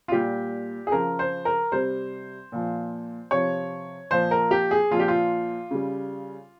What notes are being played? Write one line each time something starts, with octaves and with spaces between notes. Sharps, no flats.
F4
A#2 G3 G4
G#4
C#3 F3 A#4
C5
A#4
C3 G3 C5
A#2 F3
C3 F3 C#5
A#2 F3 C5
A#4
G4
G#4
A#2 F3 F4
G4
F4
C#3 G3